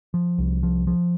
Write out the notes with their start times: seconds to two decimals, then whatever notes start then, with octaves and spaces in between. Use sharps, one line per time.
0.14 F3
0.38 C2
0.63 F3
0.87 F3